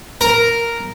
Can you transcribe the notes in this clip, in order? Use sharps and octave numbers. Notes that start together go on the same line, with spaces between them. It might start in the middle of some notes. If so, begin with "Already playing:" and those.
A#4